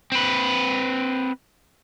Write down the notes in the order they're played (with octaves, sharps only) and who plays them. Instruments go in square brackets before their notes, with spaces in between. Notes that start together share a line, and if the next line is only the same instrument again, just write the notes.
[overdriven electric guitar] C4 B4